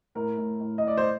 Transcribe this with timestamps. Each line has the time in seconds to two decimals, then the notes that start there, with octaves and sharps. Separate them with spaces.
0.15 A2 A#4
0.37 A2
0.60 A2
0.78 D#5
0.83 A2 D5
0.97 C5